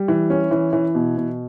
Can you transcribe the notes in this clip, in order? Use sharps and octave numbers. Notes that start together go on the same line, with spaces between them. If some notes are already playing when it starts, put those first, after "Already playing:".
Already playing: G3
E3
C#4
E3
E3
B2
B2